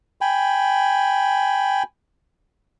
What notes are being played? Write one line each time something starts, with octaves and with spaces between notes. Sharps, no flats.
G5 G#5 B5